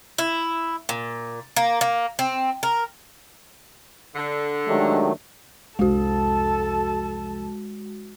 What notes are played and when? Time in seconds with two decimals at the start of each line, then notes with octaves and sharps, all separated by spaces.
0.18 E4
0.89 A#2
1.56 A#3
1.81 A#3
2.19 C4
2.63 A#4
4.16 D3
4.67 D#3 F#3 G#3 A3 D4 G4
5.79 C2 F2 G#3 F#4 A4 A5